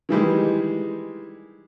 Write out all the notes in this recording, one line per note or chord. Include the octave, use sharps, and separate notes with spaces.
D#3 E3 G3 G#3